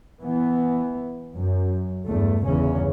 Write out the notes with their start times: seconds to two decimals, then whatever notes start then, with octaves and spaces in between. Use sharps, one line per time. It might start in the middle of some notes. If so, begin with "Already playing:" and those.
0.22 E3 B3
1.35 F#2
2.07 E2 G2 A3
2.45 G1 E2 C#3 E3 C#4